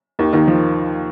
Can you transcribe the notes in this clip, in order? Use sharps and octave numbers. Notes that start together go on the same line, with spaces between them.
D#2 D#3
D#2 D#3
F3